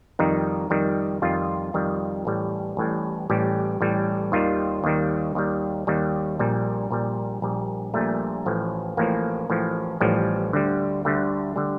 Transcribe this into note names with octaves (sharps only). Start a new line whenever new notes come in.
F2 D#3 G3 D#4
F2 D#3 G3
F2 D#3 G3 F4
F2 D#3 G3
A1 A2 G3
A1 A2 G3
A1 A2 G3 G4
A1 A2 G3
D#2 D#3 G3 F4
D#2 D#3 G3
D#2 D#3 G3
D#2 D#3 G3
A#1 A#2 G3
A#1 A#2 G3
A#1 A#2 G3
A#1 A#2 G3 A3
A1 A2 F3
A1 A2 F3 A#3
A1 A2 F3
A1 A2 F3 G3
D2 D3 G3
D2 D3 G3 A3
D3 G3